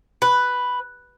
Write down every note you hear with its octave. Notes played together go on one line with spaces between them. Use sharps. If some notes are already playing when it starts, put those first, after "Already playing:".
B4